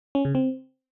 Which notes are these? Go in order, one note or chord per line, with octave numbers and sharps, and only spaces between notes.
C#4
C#3
C4